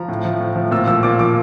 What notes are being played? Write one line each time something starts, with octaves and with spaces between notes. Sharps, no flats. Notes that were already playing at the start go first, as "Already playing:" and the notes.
Already playing: F3 A#5
A2
F3
A2
F3
A#2 E6
F3 E6
A#2 D6
F3 D6